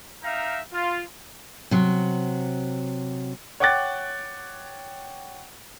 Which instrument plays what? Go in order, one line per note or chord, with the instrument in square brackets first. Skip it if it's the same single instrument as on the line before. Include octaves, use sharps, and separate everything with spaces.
[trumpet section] D#4 A#4 E5 F5 G5 A#5
F4
[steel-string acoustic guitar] C3 F#3
[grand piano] C#5 F#5 G5 D6 F#6 A6